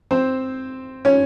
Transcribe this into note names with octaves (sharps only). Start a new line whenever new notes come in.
C4 C5
C#4 C#5